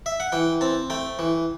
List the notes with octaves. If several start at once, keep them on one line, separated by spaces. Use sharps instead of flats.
E5
F#5
E3 G5
C4 A5
A3 G5
E3